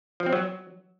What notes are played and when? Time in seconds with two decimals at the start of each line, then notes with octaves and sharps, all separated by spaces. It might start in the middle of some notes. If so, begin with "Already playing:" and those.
0.20 F3
0.26 C4
0.33 F#3